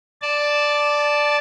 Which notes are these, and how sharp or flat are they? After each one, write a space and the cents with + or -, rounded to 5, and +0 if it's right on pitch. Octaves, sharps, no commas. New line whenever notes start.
D5 +0 A5 -10